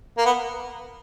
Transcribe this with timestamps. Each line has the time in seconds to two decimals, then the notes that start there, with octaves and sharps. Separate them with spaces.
0.18 A#3
0.26 B3